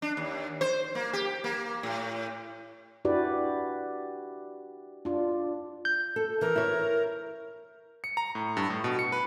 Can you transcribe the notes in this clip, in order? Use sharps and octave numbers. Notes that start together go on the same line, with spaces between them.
D4
D#2
C5
A#3
G4
A#3
A2
D4 E4 F#4 G4 B4 D5
D4 F4
G6
A4
E3 A#4
E4 C#5
C#7
A#5
A2
G2
A2
B2
C#7
B4